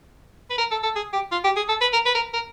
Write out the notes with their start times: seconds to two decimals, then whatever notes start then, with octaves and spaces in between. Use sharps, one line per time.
0.50 B4
0.58 A#4
0.71 A4
0.83 A4
0.95 G#4
1.13 G4
1.32 F4
1.44 G4
1.56 G#4
1.68 A4
1.81 B4
1.93 A#4
2.06 B4
2.15 A#4
2.34 A#4